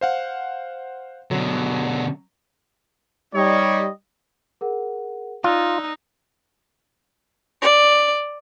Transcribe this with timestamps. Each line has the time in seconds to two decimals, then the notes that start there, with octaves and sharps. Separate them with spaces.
0.01 C5 F5 F#5
1.31 B2 D3 F#3
3.34 G3 D#4 C#5 D#5
4.61 G#4 A#4 F#5
5.44 D#4 F4 D5 E6 F#6
7.62 D5